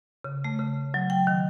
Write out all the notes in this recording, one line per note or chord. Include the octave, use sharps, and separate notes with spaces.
C#3
A3
C#3
F#3
G5
D#3